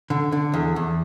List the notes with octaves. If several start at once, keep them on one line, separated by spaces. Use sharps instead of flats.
D3
D3
E2
E2